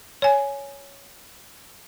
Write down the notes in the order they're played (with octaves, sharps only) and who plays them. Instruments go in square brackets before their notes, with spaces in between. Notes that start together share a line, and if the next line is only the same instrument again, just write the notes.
[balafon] C#5 G#5